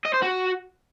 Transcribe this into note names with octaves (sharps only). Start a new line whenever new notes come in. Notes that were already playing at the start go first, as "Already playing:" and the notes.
D#5
C5
F#4